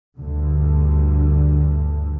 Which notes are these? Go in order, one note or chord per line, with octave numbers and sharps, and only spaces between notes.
D2 G2 D3